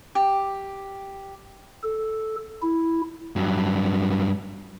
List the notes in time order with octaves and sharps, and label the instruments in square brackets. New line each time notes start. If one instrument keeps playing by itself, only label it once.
[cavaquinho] G4
[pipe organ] A4
E4
[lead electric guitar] G2 F#3